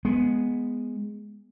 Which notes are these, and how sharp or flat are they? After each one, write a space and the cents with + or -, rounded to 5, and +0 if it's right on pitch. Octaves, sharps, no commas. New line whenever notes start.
G#3 +0 B3 +0